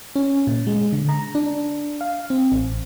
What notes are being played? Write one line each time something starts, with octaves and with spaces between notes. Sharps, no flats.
C#4
A#2
G#3
D3
A#5
D4
F5
C4
A1